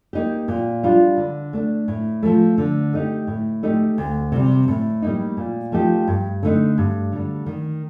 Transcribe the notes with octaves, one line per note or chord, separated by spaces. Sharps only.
A#3 D#4 G4
A#2
G3 D4 F4
D3
A3 D4
A2
F3 A3
D3
A3 D#4 G4
A2
A3 D#4 G4
D2
C3 G3
A2
G3 A#3 D#4
A#2
F3 A3 D#4 G4
G2
D3 A3 D#4
G2
D3 G3
D#3